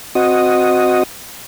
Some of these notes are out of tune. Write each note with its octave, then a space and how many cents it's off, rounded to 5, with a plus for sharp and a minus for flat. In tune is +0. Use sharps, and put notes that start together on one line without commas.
C4 +0 F#4 -10 D#5 +0